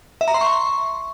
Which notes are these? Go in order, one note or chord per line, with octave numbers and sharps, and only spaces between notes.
E5
A#5
C6
C#6